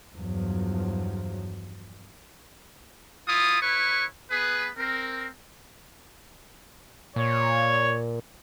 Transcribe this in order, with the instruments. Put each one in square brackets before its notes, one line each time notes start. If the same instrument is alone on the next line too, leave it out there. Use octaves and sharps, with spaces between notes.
[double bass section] E2 G2 F3 F#3
[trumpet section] E4 F4 D#6
E4 B4 C#5 C#6
B3 G#4 B4
C4 A#4
[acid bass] A#2 [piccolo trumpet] C#5